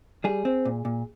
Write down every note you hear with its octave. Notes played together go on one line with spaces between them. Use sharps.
G3 G#4
C4
A#2
A#2